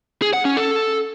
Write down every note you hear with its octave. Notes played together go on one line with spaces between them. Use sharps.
G#4
F#5
C#4
A4